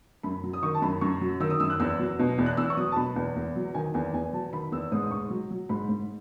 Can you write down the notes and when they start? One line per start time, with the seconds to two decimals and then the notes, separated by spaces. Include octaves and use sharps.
0.23 F#2 B5
0.44 F#3
0.53 D#6
0.63 D#3 C#6
0.74 A5
0.82 F#2 B5
1.01 F#2 C#6
1.21 F#3
1.40 D#3 E6
1.50 D#6
1.60 F#2 E6
1.70 F#6
1.80 E2 E6
1.99 F#3
2.19 B2
2.38 E2
2.46 F#6
2.57 E2 E6
2.70 C#6
2.77 F#3 D#6
2.92 A5
2.96 B2 B5
3.16 E2
3.36 E2
3.56 F#3
3.74 D#3 G#5
3.94 E2 G#5
4.13 E2 G#5
4.33 F#3 A5
4.53 D#3 B5
4.72 E2 E6
4.92 G#2 D#6
5.04 D#6
5.11 G#2 C#6
5.30 F#3
5.51 F#3
5.69 G#2 B5
5.89 G#2